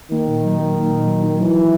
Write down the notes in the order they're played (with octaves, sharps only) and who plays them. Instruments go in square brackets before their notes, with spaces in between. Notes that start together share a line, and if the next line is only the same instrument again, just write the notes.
[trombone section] D#3 [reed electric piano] A#3
[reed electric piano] A#2
F#3
D#4
A#3
A#2
F#3
D#4
[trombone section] E3 [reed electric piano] F#3